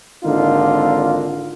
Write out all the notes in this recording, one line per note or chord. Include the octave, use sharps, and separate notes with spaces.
G#1 D3 A#3 D#4 F4